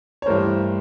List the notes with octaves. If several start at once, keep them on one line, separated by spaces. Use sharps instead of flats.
C#5
G2 E3 A3 A#4 C5